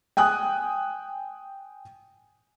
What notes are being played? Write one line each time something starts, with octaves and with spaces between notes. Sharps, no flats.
G5 G#5 D#6 F#6